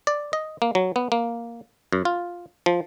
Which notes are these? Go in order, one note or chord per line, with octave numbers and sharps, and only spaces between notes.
D5
D#5
A#3
F#3
B3
A#3
F#2
F4
F3